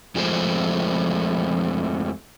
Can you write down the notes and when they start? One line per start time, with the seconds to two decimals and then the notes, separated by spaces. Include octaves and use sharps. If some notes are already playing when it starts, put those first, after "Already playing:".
0.15 F2 F3 G#3 A3 C5